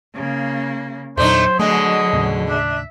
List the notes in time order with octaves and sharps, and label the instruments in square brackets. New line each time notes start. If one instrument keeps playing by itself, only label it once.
[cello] C#3 A#3
[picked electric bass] E2 A#2 [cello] F#3 [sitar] A3 D4 D#4 [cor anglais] C5
[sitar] B2 D3 G#3 [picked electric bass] A3 [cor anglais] D#5
[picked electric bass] D#2 A2 C#3
[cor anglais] D4 [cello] E5